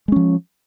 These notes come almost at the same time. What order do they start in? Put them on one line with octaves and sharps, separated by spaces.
G#3 C#4 F3